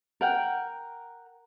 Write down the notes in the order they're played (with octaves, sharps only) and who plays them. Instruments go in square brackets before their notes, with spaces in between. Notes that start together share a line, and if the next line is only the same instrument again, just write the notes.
[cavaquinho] A#4 F#5 G5